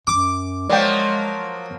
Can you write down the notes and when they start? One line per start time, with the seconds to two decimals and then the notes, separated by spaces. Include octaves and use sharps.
0.07 F#2 D6
0.70 F3 F#3 G#3 A#3 D5 G5